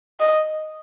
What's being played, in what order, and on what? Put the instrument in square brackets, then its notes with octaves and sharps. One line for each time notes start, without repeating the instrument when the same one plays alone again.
[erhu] D#5